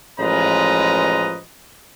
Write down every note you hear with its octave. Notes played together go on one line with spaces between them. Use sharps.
A1 F3 G#3 B4 D#5 A#5